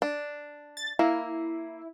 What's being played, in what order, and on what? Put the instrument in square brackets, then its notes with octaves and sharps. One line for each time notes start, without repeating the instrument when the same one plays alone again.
[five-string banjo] D4
[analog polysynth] A6
[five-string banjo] A#3 [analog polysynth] E4